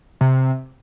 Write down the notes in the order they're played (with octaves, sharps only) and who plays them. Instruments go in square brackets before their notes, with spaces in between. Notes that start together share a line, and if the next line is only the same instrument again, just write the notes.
[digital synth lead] C3